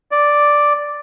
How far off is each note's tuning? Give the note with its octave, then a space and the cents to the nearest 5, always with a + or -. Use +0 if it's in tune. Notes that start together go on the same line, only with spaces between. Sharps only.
D5 +0